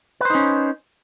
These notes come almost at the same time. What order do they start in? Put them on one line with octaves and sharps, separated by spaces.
B4 C5 D#4 C#4